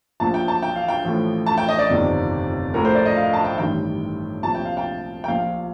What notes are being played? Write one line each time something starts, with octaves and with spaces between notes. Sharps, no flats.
A#1 A#2 F3 A5
G5
A5
G5
F5
G5
A1 A2 F3
A5
G5
D#5
D5
G1 F2 C3 D#3
A#1 A2 F3 A#4
C5
D5
D#5
F5
A5
G5
A1 G2 D#3 G5
C2 A#2 F3 A5
G5
F5
G5
G5
A#1 A#2 F3 F5